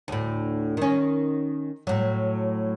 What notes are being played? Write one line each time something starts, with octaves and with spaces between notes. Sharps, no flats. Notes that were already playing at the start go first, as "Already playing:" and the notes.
D2 A2
D#3 C#4
A2 F#3